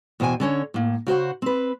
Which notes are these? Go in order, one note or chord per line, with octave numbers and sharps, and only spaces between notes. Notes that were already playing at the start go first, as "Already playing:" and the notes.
E2 B2 C5 G5 G#5
D3 C#4 C#5
A2 A#3
C#3 F#4 C5 F#5
C4 B4